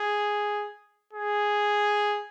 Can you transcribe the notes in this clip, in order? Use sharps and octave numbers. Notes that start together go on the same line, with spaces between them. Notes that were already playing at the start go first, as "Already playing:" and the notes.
Already playing: G#4
G#4